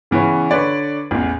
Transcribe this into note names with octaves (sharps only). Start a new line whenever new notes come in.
C#3 E3 B3 C#4
D3 B4 C#5 D5
A1 E2